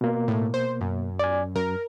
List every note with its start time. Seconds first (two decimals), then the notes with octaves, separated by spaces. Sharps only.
0.01 B2 A#3
0.28 A2
0.54 C5
0.81 F#2
1.19 D5 G#5
1.56 F#2 A#4